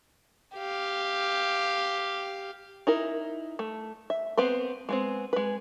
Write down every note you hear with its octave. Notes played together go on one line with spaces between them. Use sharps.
G4 F5
D#4 E4 A#4
A3
E5
B3 C4 B4 C5
G#3 B3 C4
G#3 B4